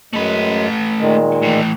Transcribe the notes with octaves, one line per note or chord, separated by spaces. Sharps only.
F#2 G#3 A3 B4
A#2 D#3 G#3
A2 E3